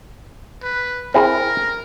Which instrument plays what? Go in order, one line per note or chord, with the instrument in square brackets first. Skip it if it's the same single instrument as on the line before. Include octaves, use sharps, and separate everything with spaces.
[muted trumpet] B4
[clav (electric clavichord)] C4 E4 G#4 [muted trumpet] A#4